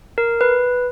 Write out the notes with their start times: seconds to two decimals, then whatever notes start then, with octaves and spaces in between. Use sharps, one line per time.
0.18 A#4
0.41 B4